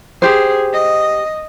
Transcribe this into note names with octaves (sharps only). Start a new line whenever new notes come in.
G4 G#4 C5
D#5